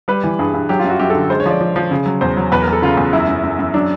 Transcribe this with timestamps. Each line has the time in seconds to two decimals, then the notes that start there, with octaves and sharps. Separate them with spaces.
0.08 G3 B4
0.24 E3
0.39 G2 G#4
0.54 G2
0.69 F#3 G4
0.80 F#2 F4
0.90 F#4
0.99 F#2 G4
1.10 D3 A4
1.30 G#3 C5
1.40 C#5
1.46 F3 D5
1.61 F3
1.76 F3
1.91 C#3
2.06 F#3
2.21 E2 C5
2.37 F#3
2.52 E2 B4
2.62 A#4
2.68 E2
2.73 A4
2.82 C#3 F4
2.97 E2
3.13 F#2 E4
3.28 F#2
3.44 F#2
3.59 F#2
3.74 F#3 D4